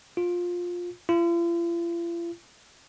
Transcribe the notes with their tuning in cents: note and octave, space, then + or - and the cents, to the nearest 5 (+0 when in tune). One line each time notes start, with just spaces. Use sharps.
F4 +15
F4 -45